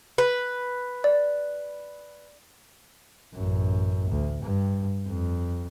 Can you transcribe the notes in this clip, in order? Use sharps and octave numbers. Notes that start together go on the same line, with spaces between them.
B4
D5
A1 F#2
D2
G2
F2